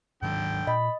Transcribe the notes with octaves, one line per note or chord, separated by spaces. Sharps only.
G#2 D3 D#3 F#3 G5
A#2 D#5 B5